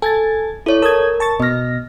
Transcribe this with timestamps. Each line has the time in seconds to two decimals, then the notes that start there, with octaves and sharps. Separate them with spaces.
0.02 A4 G#5 G#6 A6
0.66 E4 A4 C#5 D5
0.82 A#4 A5 D#6 G#6
1.20 A5 C#6 A6
1.40 B2 D#5 F6 A#6